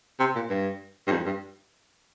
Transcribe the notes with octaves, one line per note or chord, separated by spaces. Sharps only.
C3
A#2
G2
G2
F2
G2